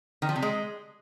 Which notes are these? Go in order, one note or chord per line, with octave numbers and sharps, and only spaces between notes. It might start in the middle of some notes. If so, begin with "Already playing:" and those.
D#3
F3
C3
G#3